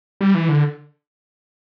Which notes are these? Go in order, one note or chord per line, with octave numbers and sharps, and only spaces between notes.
G3
E3
D3